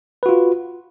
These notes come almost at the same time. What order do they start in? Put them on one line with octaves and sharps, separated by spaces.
B4 F#4 F4